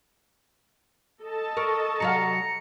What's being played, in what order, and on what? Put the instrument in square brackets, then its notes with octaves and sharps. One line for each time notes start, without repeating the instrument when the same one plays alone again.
[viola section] A4 D#5 A5
[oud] A#4 [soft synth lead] C#6
[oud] C3 F#3 F5 [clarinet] A#5 [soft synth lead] C#7